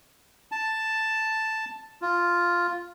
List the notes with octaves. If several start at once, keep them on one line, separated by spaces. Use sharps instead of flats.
A5
F4